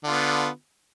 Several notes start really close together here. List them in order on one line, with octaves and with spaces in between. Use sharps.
D3 F4 B3